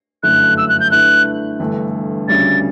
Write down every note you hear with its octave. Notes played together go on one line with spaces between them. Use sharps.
G1 F#2 D3 A3 E4 F#6
E6
F#6
G6
D3 A3 E4 B4 F#6
G1 G2 E3 A3
D2 C#3 G3 C#4 A6